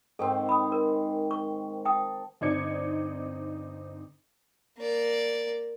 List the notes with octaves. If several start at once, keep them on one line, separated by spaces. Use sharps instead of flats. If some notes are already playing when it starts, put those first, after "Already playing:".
G#2 D#3 C4 A4
B5 D#6
A#4
C#6
G5 A5 D#6
G1 C4 D#4 D5 G#6 C#7
A#3 D5